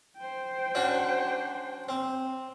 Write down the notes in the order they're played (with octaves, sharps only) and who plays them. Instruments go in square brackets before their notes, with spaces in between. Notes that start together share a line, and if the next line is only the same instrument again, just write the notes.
[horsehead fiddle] C5 G5
[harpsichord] C#4 D4 F#4
C4